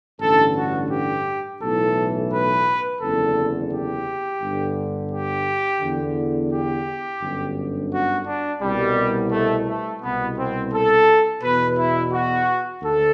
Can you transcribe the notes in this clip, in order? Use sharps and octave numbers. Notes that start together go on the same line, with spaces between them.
A1 G2 D3 A4
F#4
G4
B1 A2 E3 A4
B4
F#1 E2 D3 A4
G4
G1 G2 D3
G4
E2 D3
G4
G1 F#2 D3
F#4
D4
C2 B2 G3
A3
A3
C2 B2 B3
C4
A4
E2 B2 B4
E4
F#4
D2 A4